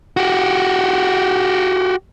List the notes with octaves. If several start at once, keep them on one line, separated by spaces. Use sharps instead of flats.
F#4 G4